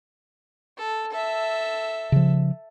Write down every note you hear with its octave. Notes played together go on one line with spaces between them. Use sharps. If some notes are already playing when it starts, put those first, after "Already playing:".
A4
A4 E5
C#3 F3